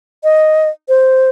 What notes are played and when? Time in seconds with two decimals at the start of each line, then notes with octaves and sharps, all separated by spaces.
0.24 D#5
0.89 C5